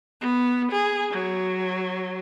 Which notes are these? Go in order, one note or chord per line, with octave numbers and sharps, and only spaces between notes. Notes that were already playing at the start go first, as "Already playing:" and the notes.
B3
G#4
F#3